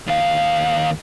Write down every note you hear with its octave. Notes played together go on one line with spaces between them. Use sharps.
D#2 F5